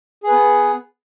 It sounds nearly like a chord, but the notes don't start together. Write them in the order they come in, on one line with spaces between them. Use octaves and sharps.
G#4 B4 B3